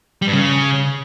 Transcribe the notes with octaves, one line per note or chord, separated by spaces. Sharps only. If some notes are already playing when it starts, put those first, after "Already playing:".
G3
G2
C#3